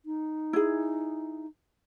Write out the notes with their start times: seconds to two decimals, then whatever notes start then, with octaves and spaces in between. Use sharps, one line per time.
0.05 D#4
0.53 E4 G#4